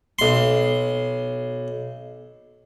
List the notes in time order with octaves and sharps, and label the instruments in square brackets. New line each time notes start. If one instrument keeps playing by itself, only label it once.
[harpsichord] B1 C6